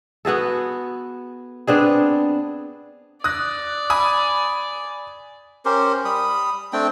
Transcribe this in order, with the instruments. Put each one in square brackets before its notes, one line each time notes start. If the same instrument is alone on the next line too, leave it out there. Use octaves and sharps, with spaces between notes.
[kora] B3 F#4 G#4 A4
B3 C4 D4 G#4
[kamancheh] D5 [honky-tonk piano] D#6 F#6 A#6
[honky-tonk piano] G#5 B5 D#6
[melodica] C#4 G4 A#4 C5
G3 B5 D#6
A3 C4 D4 G5